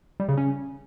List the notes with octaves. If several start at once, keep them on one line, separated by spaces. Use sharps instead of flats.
G3
C#3
C#4